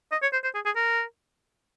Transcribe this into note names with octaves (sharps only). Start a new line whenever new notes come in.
D#5
C#5
C5
C5
G#4
G#4
A#4